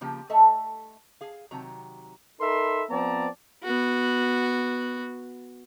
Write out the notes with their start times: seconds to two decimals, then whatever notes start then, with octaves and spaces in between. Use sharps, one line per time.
0.01 C#3 F3 A#3 G4
0.30 A3 A4 D#5 E5 A5
1.21 G#4 F5
1.51 C3 D#3 F#3 A#5
2.41 D#4 A4 A#4 E5 B5 C6
2.90 F3 B3 C4 D5 A5 A#5
3.63 B3 F#4